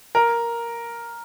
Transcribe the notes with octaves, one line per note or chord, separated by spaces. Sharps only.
A#4